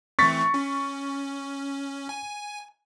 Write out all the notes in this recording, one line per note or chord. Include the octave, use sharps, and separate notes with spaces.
E3 A3 C4 C#6 A6 B6
C#4
G#5